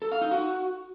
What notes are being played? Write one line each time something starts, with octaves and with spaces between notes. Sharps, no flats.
A4
F5
D#4
F#4